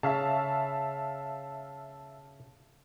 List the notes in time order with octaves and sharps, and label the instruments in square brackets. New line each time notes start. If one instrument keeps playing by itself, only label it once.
[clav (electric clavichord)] C#3 [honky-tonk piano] E5 F5 A5